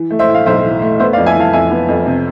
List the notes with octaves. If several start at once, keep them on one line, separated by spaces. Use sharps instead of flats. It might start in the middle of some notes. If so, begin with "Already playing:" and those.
Already playing: E3
A3
C5 E5
A2
F5
B1 C5 E5
E3
A3
B3 C5 E5
D5 F5
F2
E5 G#5
E3 F5 A5
F2 E5 G#5
B3
F2
C3